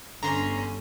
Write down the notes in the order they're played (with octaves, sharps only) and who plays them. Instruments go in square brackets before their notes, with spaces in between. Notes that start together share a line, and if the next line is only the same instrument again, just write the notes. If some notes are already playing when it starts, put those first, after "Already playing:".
[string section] G1 [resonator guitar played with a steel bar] D3 [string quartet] C#4 [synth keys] A#5 C6